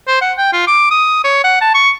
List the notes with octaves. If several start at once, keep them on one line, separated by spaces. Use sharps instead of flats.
C5
F#5
G5
F4
D6
D#6
C#5
F#5
A5
C#6